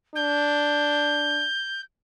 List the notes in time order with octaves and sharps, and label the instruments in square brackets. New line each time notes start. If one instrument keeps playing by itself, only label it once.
[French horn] D4 [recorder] G6